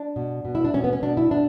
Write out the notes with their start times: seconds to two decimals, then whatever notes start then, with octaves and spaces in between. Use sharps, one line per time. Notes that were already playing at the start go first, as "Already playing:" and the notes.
Already playing: D4
0.16 B2
0.45 B2
0.55 E4
0.65 D4
0.74 B2 C#4
0.84 B3
0.93 C#4
1.02 B2 D4
1.17 E4
1.31 B2 D4